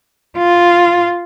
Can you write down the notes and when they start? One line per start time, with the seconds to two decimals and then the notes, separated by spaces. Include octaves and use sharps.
0.38 F4